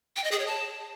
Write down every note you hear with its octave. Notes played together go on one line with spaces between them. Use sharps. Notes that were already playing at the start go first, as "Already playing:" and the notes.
G5
D#5
G#4
C#5
A5